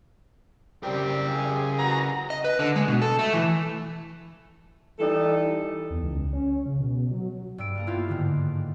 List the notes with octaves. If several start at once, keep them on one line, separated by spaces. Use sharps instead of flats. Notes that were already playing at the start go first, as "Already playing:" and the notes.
C#3 G3 C4 G4 A#4
G#4
F#4 B4 A#5
D#5
B4
D3
G#3
B2
A4
A3
E3
E3 G3 D#4 A4
E2
C#2
C#4
C#3
B2
F#3
G2 E6 D7
A#3 A4 A#4
A#3 B3 E4 F4 G4 A4
G#2 D3 D#3